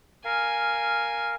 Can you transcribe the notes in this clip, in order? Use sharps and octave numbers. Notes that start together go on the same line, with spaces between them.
A#4 F5 G#5